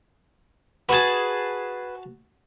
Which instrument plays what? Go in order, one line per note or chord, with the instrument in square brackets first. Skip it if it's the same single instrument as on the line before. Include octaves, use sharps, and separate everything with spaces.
[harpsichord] F#4 A5 [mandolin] G#4 B4